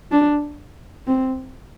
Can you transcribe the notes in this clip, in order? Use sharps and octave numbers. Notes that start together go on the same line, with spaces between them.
D4
C4